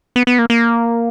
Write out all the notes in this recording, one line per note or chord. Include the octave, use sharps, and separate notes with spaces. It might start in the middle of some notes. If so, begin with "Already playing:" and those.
B3
B3
A#3
A#3